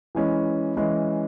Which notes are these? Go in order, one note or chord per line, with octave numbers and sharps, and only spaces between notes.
E3 G#3 C#4 E4
E3 G#3 C#4 E4